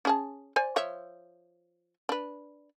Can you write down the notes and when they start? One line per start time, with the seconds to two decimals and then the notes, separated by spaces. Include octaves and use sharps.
0.05 C#4 G#4 A5
0.56 C5 D5 G#5
0.76 F3 C#5 E5
2.09 D4 B4